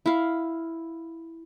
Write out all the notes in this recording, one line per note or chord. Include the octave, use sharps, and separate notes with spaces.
E4 F5